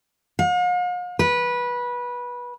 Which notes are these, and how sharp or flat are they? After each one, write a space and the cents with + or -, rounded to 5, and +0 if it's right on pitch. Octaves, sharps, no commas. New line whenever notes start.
F5 +45
B4 -20